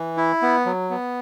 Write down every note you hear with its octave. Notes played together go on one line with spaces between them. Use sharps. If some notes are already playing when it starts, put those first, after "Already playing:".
Already playing: E3
E4
B3
F#3
B3